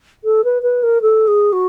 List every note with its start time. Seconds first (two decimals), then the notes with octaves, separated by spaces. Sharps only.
0.24 A4
0.44 B4
0.62 B4
0.83 A#4
1.02 A4
1.27 G#4
1.52 F#4